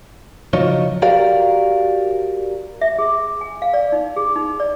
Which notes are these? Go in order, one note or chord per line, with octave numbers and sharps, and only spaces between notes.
C#3 F3 F#3 D#4 F4 C#5
F#4 G4 A#4 D5 F5
E5
G#4
G#5
F5
D5
D#4
G#4
D#4
D5